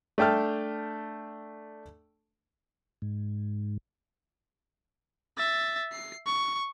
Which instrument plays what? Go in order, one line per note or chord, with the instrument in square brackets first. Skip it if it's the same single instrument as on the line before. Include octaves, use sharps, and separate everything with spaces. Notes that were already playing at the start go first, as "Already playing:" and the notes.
[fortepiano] A3 D4 G5 A5 F6
[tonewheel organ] G#2
[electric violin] E5 A6
C7
C#6